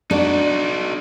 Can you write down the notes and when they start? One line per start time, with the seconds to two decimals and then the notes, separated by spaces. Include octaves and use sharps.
0.11 D4 D#4 F#4